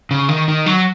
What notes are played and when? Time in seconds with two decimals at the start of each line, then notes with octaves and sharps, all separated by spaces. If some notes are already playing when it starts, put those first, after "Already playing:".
0.11 C#3
0.29 D#3
0.48 D#3
0.66 F#3